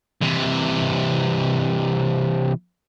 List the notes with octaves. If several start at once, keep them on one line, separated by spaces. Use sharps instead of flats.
C3 E3